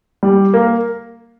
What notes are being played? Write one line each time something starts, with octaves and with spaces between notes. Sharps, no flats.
G3
A#3